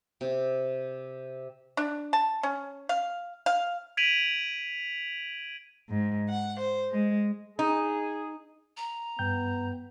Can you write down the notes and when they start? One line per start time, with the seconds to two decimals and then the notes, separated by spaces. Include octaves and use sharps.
0.21 C3
1.77 D4
2.13 A5
2.43 C#4
2.89 F5
3.46 F5
3.97 G#6 B6 D7 D#7 F7 F#7
5.88 G#2
6.29 F#5
6.59 C5
6.91 G#3
7.59 D#4 G#4
8.77 A#5
9.19 G2 B3 G5 G6